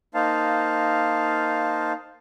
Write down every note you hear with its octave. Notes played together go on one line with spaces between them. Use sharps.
A#3 D#4 C5 F5 A5